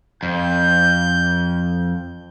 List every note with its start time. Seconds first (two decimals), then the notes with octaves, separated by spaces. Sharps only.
0.23 F2 G6